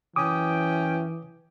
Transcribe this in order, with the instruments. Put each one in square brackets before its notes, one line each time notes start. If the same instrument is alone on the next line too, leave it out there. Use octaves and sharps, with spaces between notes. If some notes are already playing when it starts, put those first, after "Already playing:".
[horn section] F#2 C#4 G5 [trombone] E3 [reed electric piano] D6 D#6